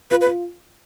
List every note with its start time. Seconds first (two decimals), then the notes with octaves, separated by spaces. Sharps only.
0.11 F4 B4
0.21 B4
0.26 F4